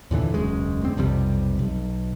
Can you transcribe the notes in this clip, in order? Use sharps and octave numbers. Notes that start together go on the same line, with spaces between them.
D#2 A#2 D3 E3
E1 C#2 F#2 G#3
D2 C4
B1 F2 C3 G3
B1